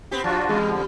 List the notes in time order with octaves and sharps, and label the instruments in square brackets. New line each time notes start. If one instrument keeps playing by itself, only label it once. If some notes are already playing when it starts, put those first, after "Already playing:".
[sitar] B3 C4 G4
[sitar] F3 [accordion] D4 F4 F#4
[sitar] E2 G3 [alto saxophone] G#3
[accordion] D3 F3